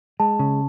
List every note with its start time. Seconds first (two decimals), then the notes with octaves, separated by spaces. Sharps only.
0.20 G#3 A5
0.39 C#3